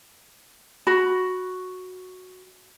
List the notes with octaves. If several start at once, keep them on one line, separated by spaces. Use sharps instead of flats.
F#4 B5